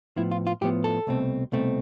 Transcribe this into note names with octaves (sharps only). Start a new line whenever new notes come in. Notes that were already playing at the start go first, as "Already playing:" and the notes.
A2 F3 B3 E4
F4
F4
A2 F3 B3 G4
A4
C2 B2 A3 C4
C2 B2 A3 C4